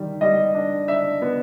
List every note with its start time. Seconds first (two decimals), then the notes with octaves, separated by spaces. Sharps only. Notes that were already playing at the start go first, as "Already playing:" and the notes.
Already playing: D#3 G3
0.21 G3 D#5
0.54 D4
0.88 D4 E5
1.22 B3